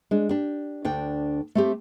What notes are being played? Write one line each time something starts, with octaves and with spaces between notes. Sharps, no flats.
G#3 D4
D4 G4
D2 D4 G5
A3 C4 G4